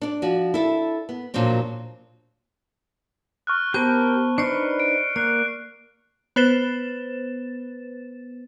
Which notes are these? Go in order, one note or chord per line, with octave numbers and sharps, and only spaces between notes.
D4 D5
F3 F#4
E4 A4
B3
A#2 F3 F#3 C4 D4
C#6 F6 F#6
B3 G4 A#4 C5 G5 A5
D4 D#4 B4 C5 D5 C#6 C7 C#7
D7
A#3 D5 F#6 C7
B3 B4 C5 A6 E7